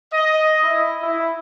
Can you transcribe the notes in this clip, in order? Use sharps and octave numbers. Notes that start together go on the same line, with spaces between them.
D#5
E4
E4